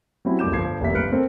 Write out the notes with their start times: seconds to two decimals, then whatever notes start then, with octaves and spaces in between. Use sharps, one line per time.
0.25 F#3 G3 C4 C#4 E4
0.39 C2 F2 D6 G6 E7
0.52 G1 F3 G#6 C7
0.81 F1 D#2 A#3 G4 E5 B6
0.94 G1 B4 F6 F#6 C#7 D7
1.12 A#3 C4 A4 A#4 C5